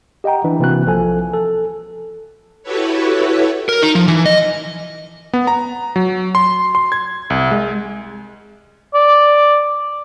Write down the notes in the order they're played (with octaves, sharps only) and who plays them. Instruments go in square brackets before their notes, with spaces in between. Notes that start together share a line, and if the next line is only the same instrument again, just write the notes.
[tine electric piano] G4 D#5 F#5 G5 A#5
E3 D4
C3 E3 A#3 C4 F#4 F#6
B1 F3 A4 G#5
A4
[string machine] E4 F#4 G4 A4 B4 C#5
[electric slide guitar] A#4
D#4
F3
E3
D#5
[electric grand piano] B3
A#5
F#3
C6
C6
G#6
C2
G#3
[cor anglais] D5